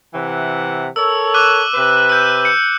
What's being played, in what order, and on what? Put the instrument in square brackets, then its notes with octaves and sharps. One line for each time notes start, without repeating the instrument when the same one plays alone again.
[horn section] C3 E3 F#5
[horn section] A4 A#4 C#5 [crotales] E6
[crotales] D6 F#6 D#7
[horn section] C3 B4
[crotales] E6 G6
C#7